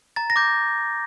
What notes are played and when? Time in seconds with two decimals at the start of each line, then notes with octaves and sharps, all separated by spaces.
0.16 A#5 A6
0.30 A#6
0.36 D6 G6